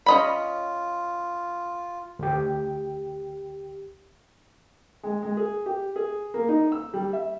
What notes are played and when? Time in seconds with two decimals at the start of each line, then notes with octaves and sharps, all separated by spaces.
0.06 C#4 F4 D#5 B5
2.19 D2 G4
5.03 G#3
5.22 G#3
5.37 G#4
5.66 G4
5.96 G#4
6.34 A#3
6.48 D#4
6.72 E6
6.94 G3
7.13 E5